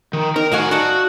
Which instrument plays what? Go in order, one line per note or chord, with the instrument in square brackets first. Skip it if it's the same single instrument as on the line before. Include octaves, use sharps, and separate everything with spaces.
[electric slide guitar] D#3
[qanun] D#4 [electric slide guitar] A#4
[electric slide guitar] A2 F#4 F#5 [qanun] D#4 F5 G#5
[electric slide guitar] F#4 [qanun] D5 D#5 A5